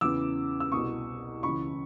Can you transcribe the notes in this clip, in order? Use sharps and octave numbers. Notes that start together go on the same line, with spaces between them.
E2 C#3 E3 D6 E6
E6
C2 B2 C#6 D#6
C#2 C#3 E3 B5 C#6